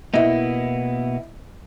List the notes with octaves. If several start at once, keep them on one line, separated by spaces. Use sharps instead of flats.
B2 A#3 B3 E4 D#5